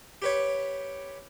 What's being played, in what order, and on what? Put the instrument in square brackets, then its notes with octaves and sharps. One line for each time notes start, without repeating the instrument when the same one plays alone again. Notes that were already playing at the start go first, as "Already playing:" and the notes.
[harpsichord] G4 B4 C#5